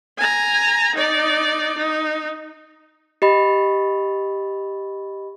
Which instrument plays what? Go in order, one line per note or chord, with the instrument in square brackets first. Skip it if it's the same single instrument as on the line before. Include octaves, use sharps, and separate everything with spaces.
[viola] G#5 A#5
D#4 D5
D#4
[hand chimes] G4 D#5 B5